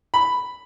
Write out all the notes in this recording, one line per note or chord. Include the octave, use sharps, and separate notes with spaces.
B5